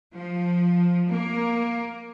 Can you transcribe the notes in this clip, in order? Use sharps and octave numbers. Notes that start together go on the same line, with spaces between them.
F3
A#3